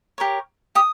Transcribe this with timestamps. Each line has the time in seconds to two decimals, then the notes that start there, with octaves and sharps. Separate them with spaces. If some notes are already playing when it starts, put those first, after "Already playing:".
0.18 G4 A#4 C#5
0.75 G4 D#6